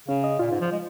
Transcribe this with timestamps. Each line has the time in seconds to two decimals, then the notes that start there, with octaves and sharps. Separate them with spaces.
0.08 C#3 C#4
0.24 D#5
0.39 A#2 F4
0.51 G#2
0.61 F3
0.72 G#3